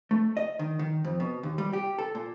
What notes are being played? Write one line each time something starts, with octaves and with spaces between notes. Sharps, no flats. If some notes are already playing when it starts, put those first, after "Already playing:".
A3
D#5
D#3
D#3
F2
B2
D#2
G3
G4
A4
A#2